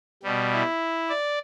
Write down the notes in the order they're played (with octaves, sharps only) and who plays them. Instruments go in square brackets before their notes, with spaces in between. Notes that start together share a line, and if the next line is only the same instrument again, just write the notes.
[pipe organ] B2 G3
E4
D5